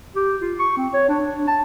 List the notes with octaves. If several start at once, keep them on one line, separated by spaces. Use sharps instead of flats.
G4
F4
C#6
C4
C#5
D4
D4
A5